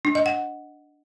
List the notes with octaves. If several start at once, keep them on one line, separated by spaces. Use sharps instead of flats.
D4
D#5
F#5